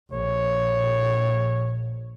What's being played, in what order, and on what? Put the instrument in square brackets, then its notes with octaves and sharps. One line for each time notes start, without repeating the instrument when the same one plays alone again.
[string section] A#1 [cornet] C#5